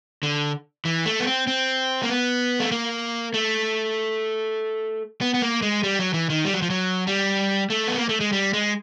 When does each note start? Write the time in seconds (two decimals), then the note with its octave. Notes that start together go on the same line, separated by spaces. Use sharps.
0.23 D3
0.85 E3
1.06 A3
1.20 B3
1.27 C4
1.47 C4
2.03 A#3
2.09 B3
2.60 A3
2.72 A#3
3.34 A3
5.21 B3
5.34 B3
5.42 A#3
5.62 G#3
5.83 G3
5.99 F#3
6.14 E3
6.30 D#3
6.45 G3
6.54 F#3
6.62 F3
6.70 F#3
7.07 G3
7.70 A3
7.87 B3
7.98 A#3
8.09 A3
8.20 G#3
8.33 G3
8.53 G#3